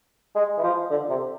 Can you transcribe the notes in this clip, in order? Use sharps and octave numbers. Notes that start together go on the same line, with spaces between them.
G#3
E3
F3
D3
C3